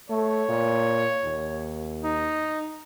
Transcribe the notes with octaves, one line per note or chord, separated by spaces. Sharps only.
A3 C#5
A#2
D#2
D#4